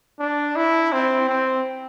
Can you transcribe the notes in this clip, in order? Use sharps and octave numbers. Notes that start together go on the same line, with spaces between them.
D4
E4
C4
C4